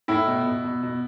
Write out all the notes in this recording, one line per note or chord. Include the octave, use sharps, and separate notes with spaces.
A2 E4
B2
B2
B2
B2